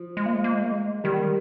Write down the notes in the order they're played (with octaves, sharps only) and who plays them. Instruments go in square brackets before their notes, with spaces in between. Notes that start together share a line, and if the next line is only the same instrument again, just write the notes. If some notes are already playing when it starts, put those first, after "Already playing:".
Already playing: [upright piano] F3
[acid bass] G#3
A#3
G#3
A#3
G#3
A#3
G#3
[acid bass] D#3 [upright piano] G3